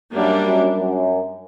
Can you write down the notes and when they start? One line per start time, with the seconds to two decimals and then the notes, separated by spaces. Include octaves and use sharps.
0.14 F#2 G3 A#3 D4
0.45 F#2
0.75 F#2